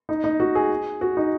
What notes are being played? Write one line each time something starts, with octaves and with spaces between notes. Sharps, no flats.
D#4
D#4
F#4
G#4
F#4
D#4